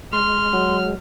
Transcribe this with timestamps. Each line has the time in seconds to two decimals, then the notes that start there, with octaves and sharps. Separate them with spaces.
0.13 G#3 C6 F6
0.53 F#3